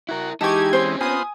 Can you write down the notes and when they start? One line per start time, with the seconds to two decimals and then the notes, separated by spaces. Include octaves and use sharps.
0.09 E4 F#4 A#4
0.41 E3 G#3 D#4 G4 A5 C#6 G#6
0.73 C4 C#4 C5 C6
1.01 B3 F4 C5 G#5 D#6